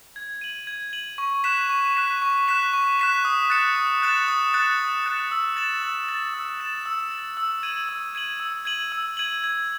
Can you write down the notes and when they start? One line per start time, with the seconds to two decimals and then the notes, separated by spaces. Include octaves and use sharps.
0.16 G#6
0.41 D#7 F#7
0.67 G#6
0.93 D#7 F#7
1.18 C#6
1.44 F#6 B6 E7
1.69 C#6
1.96 F#6 B6 E7
2.22 C#6
2.48 F#6 B6 E7
2.73 C#6
2.99 F#6 B6 E7
3.25 D#6
3.50 F#6 A6 C#7 E7
3.76 D#6
4.02 F#6 A6 C#7 E7
4.28 D#6
4.54 F#6 A6 C#7 E7
4.79 D#6
5.06 F#6 A6 C#7 E7
5.31 E6
5.57 A6 E7
5.83 E6
6.09 A6 E7
6.34 E6
6.60 A6 E7
6.86 E6
7.11 A6 E7
7.37 E6
7.63 G#6 D#7 F#7
7.89 E6
8.15 G#6 D#7 F#7
8.40 E6
8.65 G#6 D#7 F#7
8.92 E6
9.17 G#6 D#7 F#7
9.44 G#6